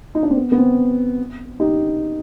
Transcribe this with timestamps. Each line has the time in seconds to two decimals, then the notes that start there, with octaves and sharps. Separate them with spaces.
0.15 D#4
0.23 D4
0.30 C4
0.37 B3
0.52 B3
0.58 C4
1.60 D#4 G4